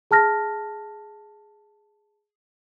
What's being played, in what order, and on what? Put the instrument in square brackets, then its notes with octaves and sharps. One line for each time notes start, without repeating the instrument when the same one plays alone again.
[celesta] G#4 A5 F6 A#6